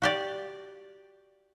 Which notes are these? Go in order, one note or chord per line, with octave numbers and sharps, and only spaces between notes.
F#4 G4 D5